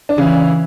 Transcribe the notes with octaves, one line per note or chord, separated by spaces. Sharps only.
D4
C#3 E3 C#4